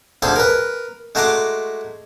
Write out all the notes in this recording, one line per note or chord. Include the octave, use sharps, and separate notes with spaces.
D2 F3 G#4 A4 C6
A#4 B4
G#3 A3 F#4 A#5 C6 D6